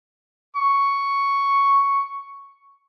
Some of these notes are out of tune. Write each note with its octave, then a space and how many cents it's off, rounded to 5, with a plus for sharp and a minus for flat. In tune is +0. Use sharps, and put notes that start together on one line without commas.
C#6 +5